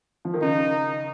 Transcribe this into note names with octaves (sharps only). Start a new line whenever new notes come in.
F3
D#3
C#3 D#4